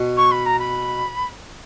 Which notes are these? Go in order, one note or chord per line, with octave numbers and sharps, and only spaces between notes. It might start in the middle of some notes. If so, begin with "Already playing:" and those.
Already playing: B2
C#6
B5
A#5
B5